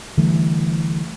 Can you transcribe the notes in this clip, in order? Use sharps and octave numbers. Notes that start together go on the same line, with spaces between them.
D3 E3 G3 A3